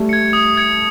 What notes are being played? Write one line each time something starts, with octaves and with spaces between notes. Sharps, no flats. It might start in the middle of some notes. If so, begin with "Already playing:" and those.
Already playing: G3 A3
G#6 C#7
D#6
G#6 C#7